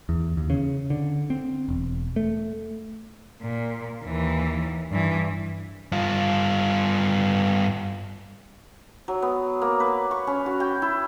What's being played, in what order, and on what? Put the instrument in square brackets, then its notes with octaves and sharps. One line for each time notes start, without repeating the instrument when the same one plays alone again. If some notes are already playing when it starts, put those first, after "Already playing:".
[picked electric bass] E2
D#2
C#3
D3
C4
E1
A3
[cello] A#2
D#2 E3
G2 E3
[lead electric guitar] G2 F4
[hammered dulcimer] F#3
B3
A#3
B4
C#6
C#4
F#4
G5
E4